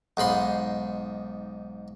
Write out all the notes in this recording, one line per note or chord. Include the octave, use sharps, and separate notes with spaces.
B1 G#2 B5 C6